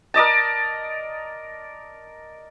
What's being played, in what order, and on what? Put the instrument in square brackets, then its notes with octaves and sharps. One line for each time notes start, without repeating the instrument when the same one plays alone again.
[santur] A#4 D5 D#5 A5